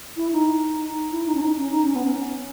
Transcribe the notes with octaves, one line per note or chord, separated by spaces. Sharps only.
E4
D#4
E4
D#4
C#4
D#4
C#4
D#4
C#4
B3
C#4